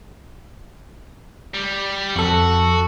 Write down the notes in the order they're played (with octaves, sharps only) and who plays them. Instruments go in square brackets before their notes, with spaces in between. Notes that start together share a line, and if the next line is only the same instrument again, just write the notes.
[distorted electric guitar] G3
[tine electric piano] F2 A4 [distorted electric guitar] F#4